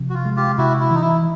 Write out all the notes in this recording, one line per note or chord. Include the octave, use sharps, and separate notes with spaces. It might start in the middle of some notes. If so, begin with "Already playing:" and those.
Already playing: C3 F3
F#4
F4
G#3
F4 G4
C3 E4 F#4
E4
E3 D#4
E4